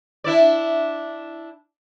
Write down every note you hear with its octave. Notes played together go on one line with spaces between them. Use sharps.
D4 E4 D5